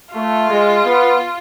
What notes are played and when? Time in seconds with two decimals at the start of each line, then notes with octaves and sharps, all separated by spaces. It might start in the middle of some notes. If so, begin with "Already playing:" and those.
0.14 A3 F4
0.49 G#3
0.84 B3